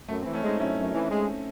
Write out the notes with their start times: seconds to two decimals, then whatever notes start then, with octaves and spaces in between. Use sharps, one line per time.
0.08 F#2 A3
0.21 C4
0.25 E3
0.33 A3 C#4
0.43 G#3 C4 D#4
0.59 F#2 C#4 E4
0.77 F#2
0.93 E3
1.10 G#3